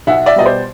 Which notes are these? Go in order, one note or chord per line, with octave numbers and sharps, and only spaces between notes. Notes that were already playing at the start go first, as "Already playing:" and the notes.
B1 E5 F#5
D5 E5
B2 G3 D#5
C5 D5